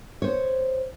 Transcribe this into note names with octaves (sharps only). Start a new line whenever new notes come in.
C5 C#5